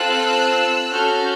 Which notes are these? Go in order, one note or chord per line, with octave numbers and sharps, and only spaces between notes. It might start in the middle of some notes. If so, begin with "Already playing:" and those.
Already playing: C4 F4 A4 E6 F#6
C#4 F#4 A4 F6 G6